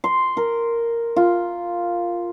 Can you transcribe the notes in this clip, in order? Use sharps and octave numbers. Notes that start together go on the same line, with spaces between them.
C6
A#4
F4